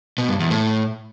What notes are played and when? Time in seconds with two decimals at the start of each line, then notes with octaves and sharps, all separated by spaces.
0.18 B2
0.29 G2
0.40 E2
0.51 A2